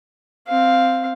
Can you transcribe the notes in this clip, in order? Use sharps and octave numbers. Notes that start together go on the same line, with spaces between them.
C4 F5